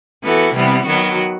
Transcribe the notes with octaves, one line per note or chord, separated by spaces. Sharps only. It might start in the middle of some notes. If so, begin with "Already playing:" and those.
E3 B3 F#4 A4
C3 E3 G3 B3
D#3 F#3 B3 F#4